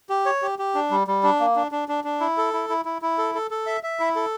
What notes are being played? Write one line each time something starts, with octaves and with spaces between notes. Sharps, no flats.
G4
C#5
G4
G4
D4
G3
G3
D4
A#3
D4
D4
D4
D4
E4
A4
E4
E4
E4
E4
A4
A4
A4
E5
E5
E4
A4